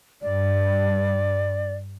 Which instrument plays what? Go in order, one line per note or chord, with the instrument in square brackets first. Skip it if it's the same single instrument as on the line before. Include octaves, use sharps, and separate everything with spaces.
[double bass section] G2 [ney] D5